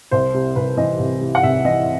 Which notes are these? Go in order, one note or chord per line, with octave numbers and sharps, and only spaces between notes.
C2 C5
C3
C2 B4
E3 D#5
C2
C3
F#5
C2 E5
E3 D#5